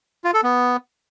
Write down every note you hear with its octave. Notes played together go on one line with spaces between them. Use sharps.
F4
A4
B3